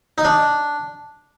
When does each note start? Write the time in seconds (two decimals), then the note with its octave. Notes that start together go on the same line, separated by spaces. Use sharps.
0.18 D#4
0.25 D4